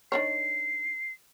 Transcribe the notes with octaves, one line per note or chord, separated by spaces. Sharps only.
D#3 D4 C#5 C7